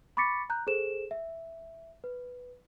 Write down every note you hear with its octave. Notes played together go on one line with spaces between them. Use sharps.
B5 C#6 D6 A6 B6 C#7
A#5 F#6 G6
G#4 A4 C5 E7
E5
B4